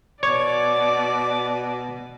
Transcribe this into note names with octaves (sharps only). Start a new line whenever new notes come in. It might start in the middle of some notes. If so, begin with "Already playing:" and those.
B2 C#5 D5 D6